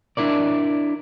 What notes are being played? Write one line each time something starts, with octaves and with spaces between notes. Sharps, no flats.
D4 E4 A#4 D5